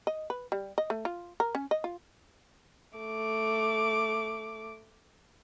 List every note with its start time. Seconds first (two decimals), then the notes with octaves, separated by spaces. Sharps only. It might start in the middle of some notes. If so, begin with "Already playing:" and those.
0.07 D#5
0.30 B4
0.52 G3
0.78 D#5
0.90 A3
1.05 F4
1.40 A#4
1.55 C#4
1.71 D#5
1.84 F4
2.99 A3 D6